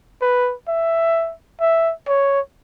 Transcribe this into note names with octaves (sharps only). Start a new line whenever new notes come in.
B4
E5
E5
C#5